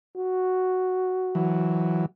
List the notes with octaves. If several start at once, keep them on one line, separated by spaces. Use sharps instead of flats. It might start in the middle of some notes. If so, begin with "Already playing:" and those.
F#4
E3 F#3